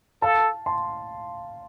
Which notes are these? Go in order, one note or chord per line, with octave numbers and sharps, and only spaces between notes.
A4 F5 A5
A5 C6